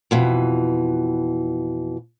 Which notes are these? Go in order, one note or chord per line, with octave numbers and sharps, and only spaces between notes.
F2 B2 E3